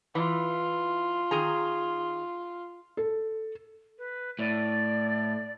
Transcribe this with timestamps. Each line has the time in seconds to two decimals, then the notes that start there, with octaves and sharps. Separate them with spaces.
0.15 E3 F4
1.31 D#3 G#4 A#5
2.97 A4
3.98 B4
4.39 A2 D5